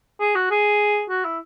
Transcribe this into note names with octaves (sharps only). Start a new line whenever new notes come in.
G#4
F#4
G#4
F#4
E4